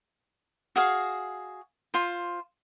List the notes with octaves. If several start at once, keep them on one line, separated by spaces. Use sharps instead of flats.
F#4 G#4 F5
F4 C5